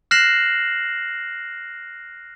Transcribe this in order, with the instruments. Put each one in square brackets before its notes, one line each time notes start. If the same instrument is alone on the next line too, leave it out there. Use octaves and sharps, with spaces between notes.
[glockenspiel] F6 F#6 A#6 C7 E7 F#7